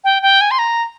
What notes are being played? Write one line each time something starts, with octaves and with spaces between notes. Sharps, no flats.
G5
G5
G#5
C6
A#5